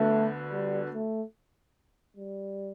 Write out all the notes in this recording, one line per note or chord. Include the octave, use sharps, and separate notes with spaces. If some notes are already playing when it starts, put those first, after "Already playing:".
Already playing: D2 D3 A3 B3
G3
A3
G3